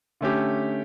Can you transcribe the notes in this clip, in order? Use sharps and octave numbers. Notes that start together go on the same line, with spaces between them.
D3 A3 C#4 G4